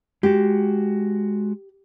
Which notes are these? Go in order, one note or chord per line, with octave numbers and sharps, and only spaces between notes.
G#3 F#4 G4